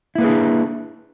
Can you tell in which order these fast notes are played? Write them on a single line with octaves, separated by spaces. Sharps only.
E4 A#3 B4 G#4 D4